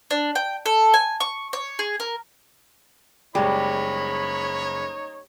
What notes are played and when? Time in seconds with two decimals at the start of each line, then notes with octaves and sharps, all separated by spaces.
0.11 D4
0.35 G5
0.66 A4
0.94 G#5
1.20 C#6
1.53 C#5
1.79 G#4
2.00 A#4
3.35 F#1 G3 G#3 D#4 C#5 B5